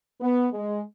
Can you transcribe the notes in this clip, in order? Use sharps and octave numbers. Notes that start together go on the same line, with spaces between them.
B3
G#3